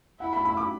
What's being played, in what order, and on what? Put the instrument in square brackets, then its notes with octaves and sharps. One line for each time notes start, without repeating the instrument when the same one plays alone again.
[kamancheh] E4 [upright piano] F#5
[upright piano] B5
B5
D6